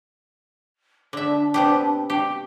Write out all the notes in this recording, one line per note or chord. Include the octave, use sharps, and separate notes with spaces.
D3 D4 E5
C3 B3 G4
G4